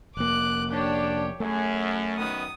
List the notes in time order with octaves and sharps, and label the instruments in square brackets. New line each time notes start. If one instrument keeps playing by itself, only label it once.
[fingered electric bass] F1 A#3 [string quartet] D6 F#6
[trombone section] D4 [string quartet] G4 C#5
[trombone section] F#2 [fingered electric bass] A3 [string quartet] G#4
[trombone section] F#2 D#3 B3 [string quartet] D#6